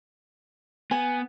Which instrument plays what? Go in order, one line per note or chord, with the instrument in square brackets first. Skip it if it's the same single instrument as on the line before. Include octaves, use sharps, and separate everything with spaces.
[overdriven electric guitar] B3 [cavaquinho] G#5